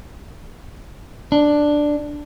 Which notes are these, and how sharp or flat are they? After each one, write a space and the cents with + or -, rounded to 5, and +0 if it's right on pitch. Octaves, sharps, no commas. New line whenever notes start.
D4 +5